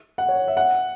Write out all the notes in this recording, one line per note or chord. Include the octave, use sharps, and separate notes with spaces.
F#5
C#5
E5
F#5